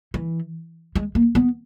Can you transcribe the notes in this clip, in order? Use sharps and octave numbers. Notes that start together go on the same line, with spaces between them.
E3
G#3
A#3
B3